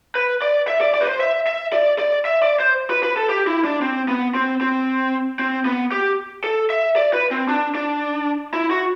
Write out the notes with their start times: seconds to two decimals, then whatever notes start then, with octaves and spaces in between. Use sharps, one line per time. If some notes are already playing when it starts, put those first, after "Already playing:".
0.15 B4
0.42 D5
0.68 E5
0.81 D5
0.94 D5
1.01 B4
1.07 C5
1.20 E5
1.47 E5
1.73 D5
1.99 D5
2.25 E5
2.42 D5
2.60 C5
2.90 B4
3.03 B4
3.16 A4
3.29 G4
3.47 E4
3.65 D4
3.82 C4
4.08 B3
4.35 C4
4.61 C4
5.39 C4
5.65 B3
5.91 G4
6.44 A4
6.70 E5
6.96 D5
7.13 B4
7.31 C4
7.49 D4
7.75 D4
8.53 E4
8.71 F#4